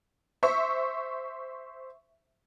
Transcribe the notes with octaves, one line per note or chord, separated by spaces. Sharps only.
C5 E5 C#6